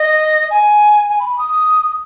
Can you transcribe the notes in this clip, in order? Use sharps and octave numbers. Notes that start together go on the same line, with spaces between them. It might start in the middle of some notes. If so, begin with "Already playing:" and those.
Already playing: D#5
G#5
G#5
B5
B5
D#6